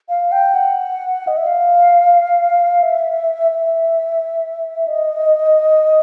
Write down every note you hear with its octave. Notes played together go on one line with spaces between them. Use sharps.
F5
G5
F#5
D#5
E5
F5
E5
E5
D#5